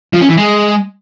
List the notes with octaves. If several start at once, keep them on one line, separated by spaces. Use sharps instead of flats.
F3
C#4
E3
G#3